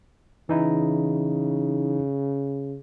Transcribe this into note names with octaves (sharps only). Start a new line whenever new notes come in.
C#3 E3 D#4 E4